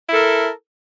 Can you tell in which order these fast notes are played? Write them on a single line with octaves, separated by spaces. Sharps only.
E4 A4 A#4